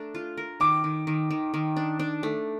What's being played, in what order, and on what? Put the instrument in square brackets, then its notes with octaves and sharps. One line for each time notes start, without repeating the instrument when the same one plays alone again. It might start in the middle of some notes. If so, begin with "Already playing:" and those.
Already playing: [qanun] A3 D4 A#4
F4
A#4
[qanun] D#3 [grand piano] D6
[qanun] D#3
D#3
D#3
D#3
D4
D4
A3